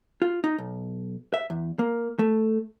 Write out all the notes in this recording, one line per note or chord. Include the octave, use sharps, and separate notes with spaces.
F4
D#4
B1
E5
E2
A#3
A3